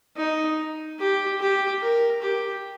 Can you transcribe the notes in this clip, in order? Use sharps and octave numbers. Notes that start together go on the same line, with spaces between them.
D#4
G4
G4
A#4
G4